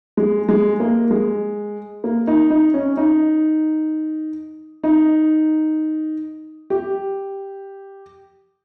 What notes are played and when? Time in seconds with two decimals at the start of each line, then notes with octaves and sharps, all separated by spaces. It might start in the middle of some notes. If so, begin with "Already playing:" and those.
0.17 G#3
0.49 G#3
0.80 A#3
1.11 G#3
2.04 A#3
2.27 D#4
2.50 D#4
2.74 C#4
2.97 D#4
4.84 D#4
6.70 G4